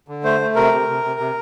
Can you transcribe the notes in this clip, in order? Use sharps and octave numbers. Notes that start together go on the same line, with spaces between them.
D3
A3 C5
A3
C3 A#4
C3
C3
C3
C3